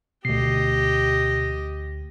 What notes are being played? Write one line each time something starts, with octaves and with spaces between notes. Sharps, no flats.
D2 B2 G4 D#5 C7